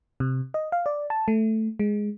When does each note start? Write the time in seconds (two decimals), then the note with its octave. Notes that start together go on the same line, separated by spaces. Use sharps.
0.20 C3
0.54 D#5
0.72 F5
0.86 D5
1.10 A5
1.28 A3
1.79 G#3